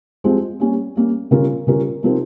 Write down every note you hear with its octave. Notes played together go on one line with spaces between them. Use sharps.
F3 G#3 C4 G4
G3 A#3 C#4
G3 A#3 C#4
C#3 G3 C#4 F4 A#4
C#3 G3 C#4 F4 A#4
C3 F3 C4 D#4 A#4